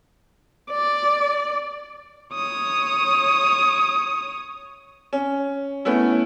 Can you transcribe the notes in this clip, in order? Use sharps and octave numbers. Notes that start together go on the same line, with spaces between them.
D5
C#5 D#6
C#4
A3 B3 C#4 E4